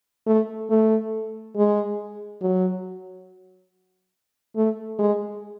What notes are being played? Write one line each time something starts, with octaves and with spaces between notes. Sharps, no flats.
A3
A3
G#3
F#3
A3
G#3